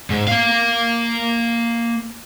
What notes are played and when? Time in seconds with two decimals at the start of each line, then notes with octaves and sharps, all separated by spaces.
0.10 G#2
0.28 A#3 F5